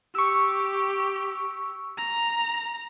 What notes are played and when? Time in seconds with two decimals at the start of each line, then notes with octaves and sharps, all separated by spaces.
0.15 G4 C#6 E6
1.97 A#5